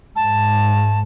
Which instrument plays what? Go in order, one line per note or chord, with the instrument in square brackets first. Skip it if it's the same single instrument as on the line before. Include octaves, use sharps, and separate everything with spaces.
[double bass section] G#2 [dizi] A5